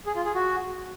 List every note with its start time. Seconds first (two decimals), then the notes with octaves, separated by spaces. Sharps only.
0.06 G#4
0.16 F4
0.25 G#4
0.35 F#4